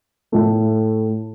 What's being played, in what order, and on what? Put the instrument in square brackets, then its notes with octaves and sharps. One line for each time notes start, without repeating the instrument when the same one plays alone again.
[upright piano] A2 A3